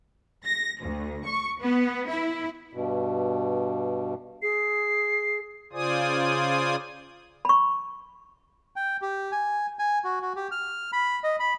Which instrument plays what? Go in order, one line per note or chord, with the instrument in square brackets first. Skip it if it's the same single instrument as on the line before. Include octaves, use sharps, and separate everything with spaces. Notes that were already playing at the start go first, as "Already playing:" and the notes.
[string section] A#6
D2
C#6
B3
E4
[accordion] G2 B2
[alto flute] G#4 [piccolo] C7
[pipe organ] C#3 F4 C5 D5 G#5 D#6
[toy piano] B5 C#6
[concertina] G5
G4
G#5
G#5
F#4
F#4
G4
F6
B5
D#5
B5